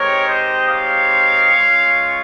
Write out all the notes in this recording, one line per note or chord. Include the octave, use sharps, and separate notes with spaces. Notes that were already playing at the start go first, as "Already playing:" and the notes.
Already playing: G#3 C4 D#4 G4 A#4 C#5
C5 D#5
C#5 F5
G#3 C#4 F4